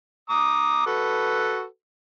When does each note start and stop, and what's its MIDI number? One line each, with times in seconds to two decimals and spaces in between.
0.30 0.84 82
0.30 0.84 86
0.30 0.84 87
0.87 1.64 66
0.87 1.64 69
0.87 1.64 71